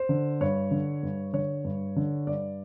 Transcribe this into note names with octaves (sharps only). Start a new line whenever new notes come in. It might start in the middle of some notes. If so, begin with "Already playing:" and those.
Already playing: C5
D3
G2 C#5
D3
G2
D3 C#5
G2
D3
G2 D5